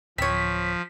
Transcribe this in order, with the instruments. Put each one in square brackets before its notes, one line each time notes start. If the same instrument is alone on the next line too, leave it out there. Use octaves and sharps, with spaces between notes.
[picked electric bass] D1 [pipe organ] F3 [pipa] C4 C#5 [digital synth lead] B6